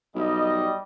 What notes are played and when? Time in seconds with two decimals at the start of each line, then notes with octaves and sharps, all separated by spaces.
0.15 B1 G3 D#5